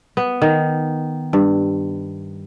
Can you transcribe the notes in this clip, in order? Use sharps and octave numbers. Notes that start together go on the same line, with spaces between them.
B3
D#3
G2